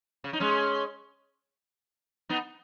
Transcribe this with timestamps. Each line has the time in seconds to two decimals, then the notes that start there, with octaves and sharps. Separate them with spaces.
0.24 C#3
0.33 D#4
0.40 G#3 C#4
2.29 B3 D#4